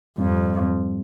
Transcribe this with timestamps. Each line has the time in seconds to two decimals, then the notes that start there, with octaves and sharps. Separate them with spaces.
0.18 F2 G#2 G3 C4